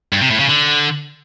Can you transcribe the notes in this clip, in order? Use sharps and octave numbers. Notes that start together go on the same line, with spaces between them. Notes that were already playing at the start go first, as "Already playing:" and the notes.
G2
C3
A2
C#3
D3